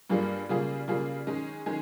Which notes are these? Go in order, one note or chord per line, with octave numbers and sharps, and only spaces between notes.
G2 G3 A#3 F4 G#4
C#3 G3 A#3 F4 G#4
C#3 G3 A#3 F4 G#4
D#3 G#3 C#4 G#4
D#3 G#3 C#4 G#4